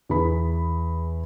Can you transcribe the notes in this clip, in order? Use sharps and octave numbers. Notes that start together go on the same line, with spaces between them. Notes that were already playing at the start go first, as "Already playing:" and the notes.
E2 G#4 B5